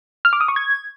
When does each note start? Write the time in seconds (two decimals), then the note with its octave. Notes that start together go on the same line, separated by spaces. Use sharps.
0.25 F6
0.33 D6
0.41 D#6
0.48 C#6
0.56 G#6